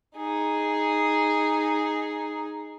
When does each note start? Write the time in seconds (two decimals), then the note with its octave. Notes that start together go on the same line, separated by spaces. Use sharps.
0.17 D#4 G#4